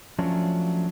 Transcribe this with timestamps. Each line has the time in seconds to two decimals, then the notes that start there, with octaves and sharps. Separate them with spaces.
0.18 F3 F#3 A3 C#4 D4 F4